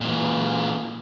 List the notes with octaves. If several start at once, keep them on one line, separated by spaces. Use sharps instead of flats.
A#2 E3